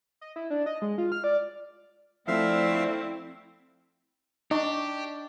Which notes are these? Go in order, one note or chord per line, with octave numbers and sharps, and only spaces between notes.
D#5
E4
D4
D#5
G#3
F4
F6
D5
D3 F3 A3 C4 E4 E5 F5
D4 D#4 G4 D#5 C#6 D6